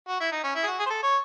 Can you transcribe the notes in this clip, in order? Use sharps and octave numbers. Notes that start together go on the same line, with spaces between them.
F#4
E4
D#4
C#4
E4
G#4
F#4
G#4
C5
A4
C#5